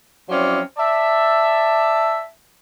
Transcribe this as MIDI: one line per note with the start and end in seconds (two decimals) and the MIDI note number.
0.29 0.59 53
0.29 0.59 54
0.29 0.59 60
0.29 0.59 61
0.29 0.59 64
0.29 0.59 74
0.77 2.23 74
0.77 2.23 76
0.77 2.23 81